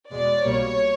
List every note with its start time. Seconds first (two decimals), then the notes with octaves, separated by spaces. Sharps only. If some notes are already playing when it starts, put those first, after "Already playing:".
0.11 E2 B2 G#3 D5
0.44 C2 B2 G3 A#3 C#5